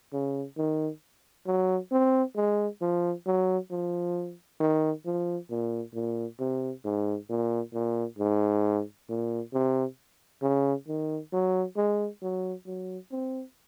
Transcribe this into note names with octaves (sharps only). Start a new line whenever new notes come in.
C#3
D#3
F#3
C4
G#3
F3
F#3
F3
D#3
F3
A#2
A#2
C3
G#2
A#2
A#2
G#2
A#2
C3
C#3
D#3
F#3
G#3
F#3
F#3
C4